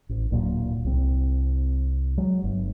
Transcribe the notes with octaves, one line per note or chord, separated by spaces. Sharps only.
A1
D1 A#2 F#3
C2 C4
F#3 G#3
G1